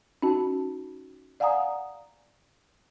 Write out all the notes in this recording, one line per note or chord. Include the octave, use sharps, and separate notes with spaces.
C#4 D#4 F#4 A5
D5 F5 F#5 G#5 A#5 D#6